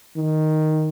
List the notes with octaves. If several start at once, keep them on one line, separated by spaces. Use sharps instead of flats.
D#3